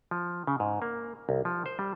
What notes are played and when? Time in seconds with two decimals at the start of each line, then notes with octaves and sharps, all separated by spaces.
0.11 F3
0.47 C#3
0.60 G#2
0.82 A#3
1.29 C2
1.45 F3
1.66 C5
1.79 G3